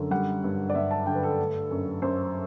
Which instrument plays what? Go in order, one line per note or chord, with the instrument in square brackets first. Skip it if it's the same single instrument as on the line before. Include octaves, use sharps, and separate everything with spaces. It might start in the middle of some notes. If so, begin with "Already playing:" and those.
Already playing: [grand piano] F#2 D3
G3 F#5
G2
D5
G2 E5
A5
D3 G5
B4
A4
A3
F#2
F#2 C5